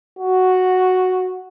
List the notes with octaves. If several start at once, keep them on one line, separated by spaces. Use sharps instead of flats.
F#4